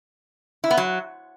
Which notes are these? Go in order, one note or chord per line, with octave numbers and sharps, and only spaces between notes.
E4
B3
F#3